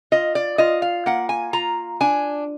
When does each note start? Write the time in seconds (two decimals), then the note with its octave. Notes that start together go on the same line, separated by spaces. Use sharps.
0.12 F4 D#5
0.35 D5
0.58 F4 D#5
0.82 F5
1.06 A#3 F#5
1.29 G#5
1.53 F4 A#5
2.01 D4 G#5